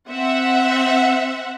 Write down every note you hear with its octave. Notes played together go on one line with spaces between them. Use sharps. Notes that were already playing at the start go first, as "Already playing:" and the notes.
C4 E5 F#5